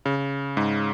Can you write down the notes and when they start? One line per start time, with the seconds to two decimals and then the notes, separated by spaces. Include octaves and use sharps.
0.06 C#3
0.57 G#2